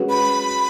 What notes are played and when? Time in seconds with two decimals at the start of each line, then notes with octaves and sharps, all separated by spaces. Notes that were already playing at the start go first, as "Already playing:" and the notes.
Already playing: G#3 C#4 F#4 B4
0.10 B5